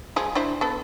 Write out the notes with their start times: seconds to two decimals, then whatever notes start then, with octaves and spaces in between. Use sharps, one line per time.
0.16 F3 G#3 G#4
0.35 D4 E4 C5
0.61 B3 A4